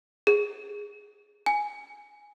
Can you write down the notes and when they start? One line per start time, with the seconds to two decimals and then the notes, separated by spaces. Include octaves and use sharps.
0.27 G#4
1.46 G#5